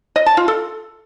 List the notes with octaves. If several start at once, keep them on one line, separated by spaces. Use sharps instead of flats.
D#5
A5
F4
A4